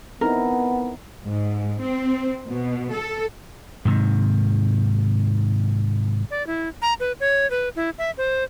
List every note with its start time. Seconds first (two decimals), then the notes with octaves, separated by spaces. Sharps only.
0.21 B3 C4 D#4 E4 A#4
1.26 G#2
1.81 C4
2.48 B2
2.92 A4
3.85 G#2 C3 D#3
6.31 D5
6.47 E4
6.82 A#5
7.00 B4
7.20 C#5
7.51 B4
7.76 E4
7.98 E5
8.18 C5